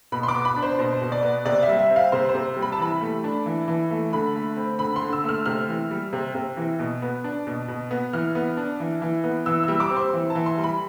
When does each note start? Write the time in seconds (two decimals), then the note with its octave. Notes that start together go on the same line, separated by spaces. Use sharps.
0.12 B2 B5
0.23 C6
0.28 D6
0.34 B3
0.45 B5
0.56 D4
0.62 C5
0.79 B2 C5
1.02 B2
1.12 D5
1.23 B3
1.45 C3 D5
1.62 E5
1.68 G3
1.79 E5
1.90 C4
1.96 F5
2.12 C3 C5
2.29 C5
2.34 C3
2.57 G3
2.62 B5
2.72 A5
2.79 E3 B5
3.01 A3
3.24 D4
3.46 E3
3.68 E3
3.91 A3
4.13 D3 B5
4.35 A3
4.57 C4
4.79 D3 B5
4.96 C6
5.02 D3
5.13 E6
5.24 A3 F6
5.46 C3 F6
5.68 E3
5.91 G3
6.13 C3
6.35 C3
6.57 E3
6.79 B2
7.02 B3
7.24 D4
7.47 B2
7.68 B2
7.91 B3
8.13 E3 F6
8.35 B3
8.57 D4
8.80 E3
9.02 E3
9.24 B3
9.46 E3 E6
9.63 G3 E6
9.80 D6
9.90 C4
9.96 C6
10.13 E3
10.30 A5
10.35 E3
10.46 C6
10.58 G3
10.64 B5